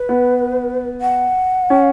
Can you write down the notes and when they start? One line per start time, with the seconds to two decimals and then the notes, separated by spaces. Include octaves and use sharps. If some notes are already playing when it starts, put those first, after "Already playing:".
Already playing: B4
0.09 B3
1.01 F#5
1.70 C#4